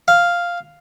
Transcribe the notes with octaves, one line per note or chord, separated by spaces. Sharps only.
F5